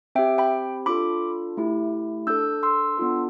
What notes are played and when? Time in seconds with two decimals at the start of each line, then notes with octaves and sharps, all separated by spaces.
0.15 C4 E5 G5
0.19 G4
0.38 G5 B5
0.86 D4 F4 A4 B5 D6
1.57 A3 E4 G4
2.27 D4 A4 E6 G6
2.63 C6 E6
2.98 B3 D4 F4 A4